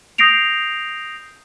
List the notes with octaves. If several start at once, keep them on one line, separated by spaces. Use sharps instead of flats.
D#6 G6 A#6 C7 D7 F7